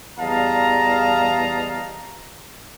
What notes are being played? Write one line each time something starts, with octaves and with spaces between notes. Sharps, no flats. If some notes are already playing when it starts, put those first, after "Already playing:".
E2 G3 D#5 F5 A5 A#5